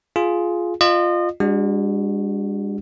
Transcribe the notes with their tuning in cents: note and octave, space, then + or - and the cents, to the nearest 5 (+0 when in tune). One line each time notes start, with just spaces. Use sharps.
F4 +0 G#4 +10
F4 +0 D#5 -35
G#3 -45 D4 +0 F#4 +0